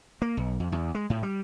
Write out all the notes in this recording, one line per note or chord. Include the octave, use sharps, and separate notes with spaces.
A#3
B1
F2
E2
G#3
A2
G3